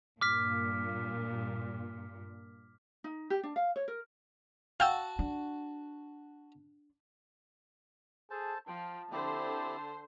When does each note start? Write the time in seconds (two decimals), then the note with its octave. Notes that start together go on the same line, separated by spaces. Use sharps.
0.21 G2 A#2 D6 F6 B6
3.04 D#4
3.30 G4
3.43 D4
3.56 F5
3.76 C#5
3.88 A#4
4.80 F#4 F5 G5 A5 E6
5.19 D4
8.31 G#4 A4 C5 A5
8.68 F3 G5 A5
9.12 D3 C4 E4 G4 C5